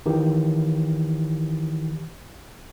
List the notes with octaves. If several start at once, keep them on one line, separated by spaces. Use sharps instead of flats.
D#3 E3 G4